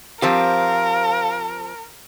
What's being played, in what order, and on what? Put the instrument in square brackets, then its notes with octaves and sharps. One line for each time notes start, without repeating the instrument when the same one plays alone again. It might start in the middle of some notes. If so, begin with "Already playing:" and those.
[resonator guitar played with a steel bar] F3 C4 G4 [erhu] A#4 [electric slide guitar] F5